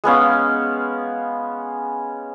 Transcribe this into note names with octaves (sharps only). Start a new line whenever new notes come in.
G#3 B3 C#4 F5